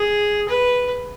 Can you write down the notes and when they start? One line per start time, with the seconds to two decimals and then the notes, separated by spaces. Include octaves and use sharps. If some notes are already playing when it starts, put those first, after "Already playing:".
Already playing: G#4
0.49 B4